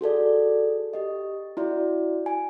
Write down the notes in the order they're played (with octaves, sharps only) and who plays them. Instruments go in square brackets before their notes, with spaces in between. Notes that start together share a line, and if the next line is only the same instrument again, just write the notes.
[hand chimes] F#4 G#4 A4 D5
G4 D#5
E4 F#4 D5
G#5